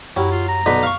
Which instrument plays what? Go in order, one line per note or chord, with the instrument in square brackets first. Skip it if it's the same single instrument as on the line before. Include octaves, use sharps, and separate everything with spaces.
[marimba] F#2 G4 [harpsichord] F#3 [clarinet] E4
[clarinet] F4
A#5
[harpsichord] B1 D3 B4
F5 C#6